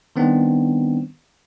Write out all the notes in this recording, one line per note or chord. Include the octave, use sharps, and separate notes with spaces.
D#3 G3 B3 C4 D4 D#4